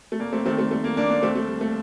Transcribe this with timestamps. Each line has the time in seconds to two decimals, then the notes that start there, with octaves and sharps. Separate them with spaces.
0.12 A3
0.20 F1 A#3
0.33 A3 C4
0.46 D#3 A3 C4
0.58 A3 C4
0.71 G3 A3
0.84 A#3
0.97 D#2 A#3 D4
1.10 A#3 D4
1.23 D#2 A3 C4
1.35 A3
1.48 G3
1.61 A3